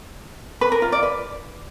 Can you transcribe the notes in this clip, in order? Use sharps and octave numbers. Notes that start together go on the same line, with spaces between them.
B4
A#4
F4
D5
B4